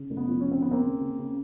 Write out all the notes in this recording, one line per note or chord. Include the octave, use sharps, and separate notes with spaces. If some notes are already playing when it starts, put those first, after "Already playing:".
Already playing: C#3
F1
B3
F3
C#4
C#3 C4
D#2 B3
A#3 C4
C#3
C#3
C#3